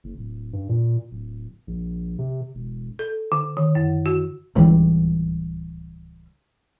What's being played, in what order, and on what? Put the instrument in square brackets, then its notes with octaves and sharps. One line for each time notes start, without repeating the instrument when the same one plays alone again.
[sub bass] F#1
D1
G2
A#2
D1
A#1
C3
E1
[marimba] A4
D3
D#3
F#2
F#4
[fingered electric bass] D1 C#2 E3 G3